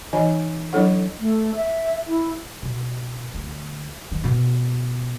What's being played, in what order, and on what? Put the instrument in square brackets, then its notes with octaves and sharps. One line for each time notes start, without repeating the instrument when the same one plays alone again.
[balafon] E3 D#4 D#5 G#5
F#3 D4 E4 A4 C#5 F#5
[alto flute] A3
E5
E4
[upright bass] B2
D2
D#3
B2